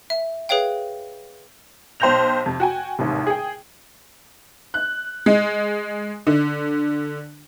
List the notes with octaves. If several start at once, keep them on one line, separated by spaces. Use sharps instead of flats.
E5
G#4 B4 C#5 F5 G5
B1 C5 G5 G6 A#6 F7
F2 C3
F#4 G5 G#5
A1 D#2 G#2 C3
G#4 G5
F#6
G#3
D3